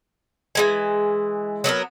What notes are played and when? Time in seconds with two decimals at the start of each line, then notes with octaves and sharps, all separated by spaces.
0.55 E3 G#3 G#5
1.64 F#3 B3 D#4 A#4